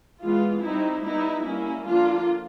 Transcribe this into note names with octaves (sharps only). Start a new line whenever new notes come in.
E3 G#3 B3 F4
G3 C4 D#4 E4
G3 B3 D#4 E4
G3 A#3 C#4 E4
D3 F3 A#3 D4 F4